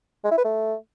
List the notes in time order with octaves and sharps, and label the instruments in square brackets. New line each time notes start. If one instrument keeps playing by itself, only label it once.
[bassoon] G#3
E4
B4
A3